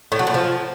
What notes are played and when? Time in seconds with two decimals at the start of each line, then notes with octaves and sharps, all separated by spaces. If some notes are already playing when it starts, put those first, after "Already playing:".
0.12 A2
0.19 F#3
0.27 A#2
0.34 F3